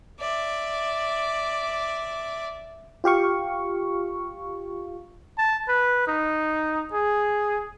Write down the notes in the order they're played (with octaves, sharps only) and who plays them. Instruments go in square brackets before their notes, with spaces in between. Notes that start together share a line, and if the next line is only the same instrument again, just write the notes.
[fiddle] D5 E5
[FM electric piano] F4 G4 F5 C#6
[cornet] A5
B4
D#4
G#4